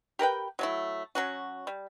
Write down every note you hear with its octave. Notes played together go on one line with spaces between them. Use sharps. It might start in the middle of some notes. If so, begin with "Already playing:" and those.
G4 A#4 B4 G5
F#3 A3 E4
F#3 C#4 F#4
G3